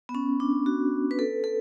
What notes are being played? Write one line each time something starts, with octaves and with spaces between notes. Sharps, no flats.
B3
C#4
D4
F#4
B4
A4
A4